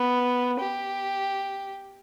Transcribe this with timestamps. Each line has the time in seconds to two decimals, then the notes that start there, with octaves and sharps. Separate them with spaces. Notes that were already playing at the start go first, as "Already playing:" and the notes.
Already playing: B3
0.59 G4